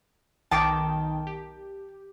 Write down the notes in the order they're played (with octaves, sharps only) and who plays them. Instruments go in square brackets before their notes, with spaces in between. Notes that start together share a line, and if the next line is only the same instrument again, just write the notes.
[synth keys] B1 D#3 G5 [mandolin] A5 D6
[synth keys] G4